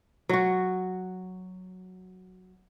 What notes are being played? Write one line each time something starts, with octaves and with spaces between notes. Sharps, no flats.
F#3 F#4